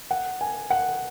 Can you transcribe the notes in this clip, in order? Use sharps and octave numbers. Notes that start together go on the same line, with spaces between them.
F#5
G#5
F#5